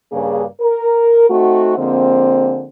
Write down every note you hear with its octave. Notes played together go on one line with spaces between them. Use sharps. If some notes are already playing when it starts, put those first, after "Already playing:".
G2 C#3 A#3 D4 G#4
A#4
A3 C4 D#4 F#4
D3 F3 G#3 A#3 C4